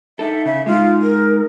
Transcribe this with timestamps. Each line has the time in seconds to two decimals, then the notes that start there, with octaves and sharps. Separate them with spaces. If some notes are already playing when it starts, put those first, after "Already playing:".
0.19 D#4 A4 E5
0.45 C#3 E5
0.66 G#3 D#4 F4
1.02 A#4